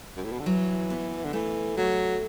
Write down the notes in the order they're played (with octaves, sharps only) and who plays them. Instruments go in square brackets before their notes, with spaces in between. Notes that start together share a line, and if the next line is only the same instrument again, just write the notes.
[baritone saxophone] F#2
A2
B2
D3
[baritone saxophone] E3 [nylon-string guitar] F#3
[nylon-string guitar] B3
[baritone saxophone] D3
[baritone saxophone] E3 [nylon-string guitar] A3
[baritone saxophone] F#3 [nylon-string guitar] A3